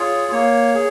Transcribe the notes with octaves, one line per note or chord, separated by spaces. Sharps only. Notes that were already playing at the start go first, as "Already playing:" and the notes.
Already playing: F4 G#4 C#5
A#3 C#5
G#4